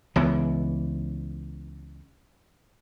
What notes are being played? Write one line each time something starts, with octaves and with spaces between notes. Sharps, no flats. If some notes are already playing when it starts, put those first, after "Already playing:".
C#2 E3 B3